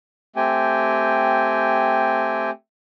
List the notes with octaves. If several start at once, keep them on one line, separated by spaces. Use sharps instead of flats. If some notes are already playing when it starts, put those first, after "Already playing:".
A3 C4 G4 G5 G#5